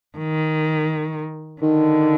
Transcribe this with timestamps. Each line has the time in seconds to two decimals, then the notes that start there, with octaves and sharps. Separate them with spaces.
0.18 D#3
1.61 D3 D#3